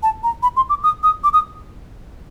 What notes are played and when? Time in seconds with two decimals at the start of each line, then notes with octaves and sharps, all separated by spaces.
0.03 A5
0.23 A#5
0.43 B5
0.56 C6
0.69 D6
0.83 D#6
1.03 D#6
1.24 D6
1.33 D#6